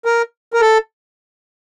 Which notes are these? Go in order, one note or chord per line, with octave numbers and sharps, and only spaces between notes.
A#4
A#4
A4